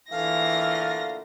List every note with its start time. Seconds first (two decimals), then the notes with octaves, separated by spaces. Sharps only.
0.11 A#2 D3 E3 A3 F5 A#6